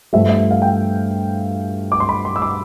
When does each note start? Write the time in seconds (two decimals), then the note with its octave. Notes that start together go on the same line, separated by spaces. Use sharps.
0.13 G2 F3 A3 E5
0.29 E5
0.51 F5
0.62 G5
1.92 D6
2.00 C6
2.09 B5
2.25 C6
2.36 E6
2.42 D6